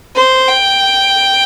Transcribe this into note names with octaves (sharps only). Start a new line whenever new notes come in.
C5
G5